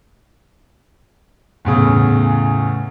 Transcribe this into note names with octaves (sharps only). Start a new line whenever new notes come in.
E2 A2 C#3